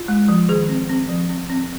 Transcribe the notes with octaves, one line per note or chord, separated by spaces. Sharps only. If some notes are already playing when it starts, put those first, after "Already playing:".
Already playing: F4
G#3
F3
D#3 G#4
C4
C4
F3
C4
C4